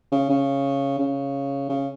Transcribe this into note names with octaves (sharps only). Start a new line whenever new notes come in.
C#3
C#3
C#3
C#3